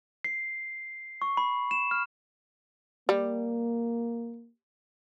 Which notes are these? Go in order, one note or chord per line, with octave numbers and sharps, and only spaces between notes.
C7
C#6
B5
E7
F6
G3 A#3